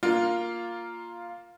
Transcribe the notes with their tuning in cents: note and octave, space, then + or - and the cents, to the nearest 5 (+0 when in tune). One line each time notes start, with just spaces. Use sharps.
A#3 +0 F4 +0